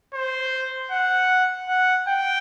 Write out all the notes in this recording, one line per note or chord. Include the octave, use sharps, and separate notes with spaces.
C5
F#5
F#5
G5